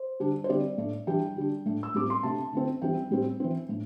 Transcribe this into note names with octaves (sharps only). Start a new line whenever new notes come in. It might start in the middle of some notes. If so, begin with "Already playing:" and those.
Already playing: C5
D3 G3 D4
C5
D3 G3 C4 D5
A2 A3 D4
E3 G3 D4 G5
D3 G3 D4
A2 A3 D4
E6
A2 G3 C4 D6
C6
C3 A3 D4 A5
D3 A3 C4
E3 G3 C4 G5
A2 G3 C4
E3 C4
A2 A3 D4